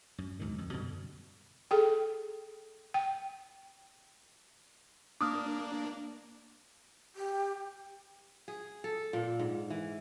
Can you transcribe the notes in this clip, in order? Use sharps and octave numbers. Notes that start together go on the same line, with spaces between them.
F#2
D2 G#2 B2 D#3
F2
F#2 B2 D3 G3
G#4 A4 G5
G5
A#3 D4 D6 D#6 F6
G4
G#4
A4
A#2
G#2
E3